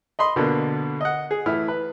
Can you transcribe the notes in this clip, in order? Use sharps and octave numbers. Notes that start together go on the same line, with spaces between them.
D#5 B5 C6
B2 D3 A#3 B3
D#5 F#5
G#4
A2 E3 E4 F6
B4